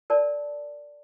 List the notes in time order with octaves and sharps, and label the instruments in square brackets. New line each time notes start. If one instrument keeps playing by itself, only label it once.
[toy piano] A#4 D5 A5